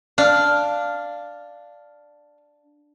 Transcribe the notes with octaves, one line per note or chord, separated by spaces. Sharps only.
D4 F5 F6